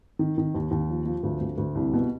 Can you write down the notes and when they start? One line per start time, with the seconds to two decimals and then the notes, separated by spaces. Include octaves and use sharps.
0.19 D#3
0.38 D#3
0.55 D#2
0.71 D#2
0.89 F3
1.06 F3
1.23 D2
1.41 D2
1.58 D2
1.75 C2
1.93 B2